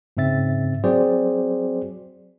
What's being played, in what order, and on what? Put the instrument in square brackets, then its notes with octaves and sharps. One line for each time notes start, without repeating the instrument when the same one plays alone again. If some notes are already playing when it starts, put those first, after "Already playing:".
[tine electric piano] G#2 C#3 C4 E5 A6
F#3 C4 F#4 G#4 C5 D5